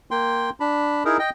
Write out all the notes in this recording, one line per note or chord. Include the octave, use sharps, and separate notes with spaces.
A#3 G5 C6
D4 B5
D#4 E4 G#4 A#4
D#5 G5